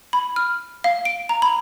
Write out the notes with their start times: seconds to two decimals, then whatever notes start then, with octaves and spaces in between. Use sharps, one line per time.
0.13 B5
0.36 F6
0.84 F5
1.05 D7
1.29 A#5
1.42 B5